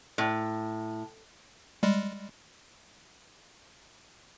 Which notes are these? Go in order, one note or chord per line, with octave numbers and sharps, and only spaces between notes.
A2
G3 G#3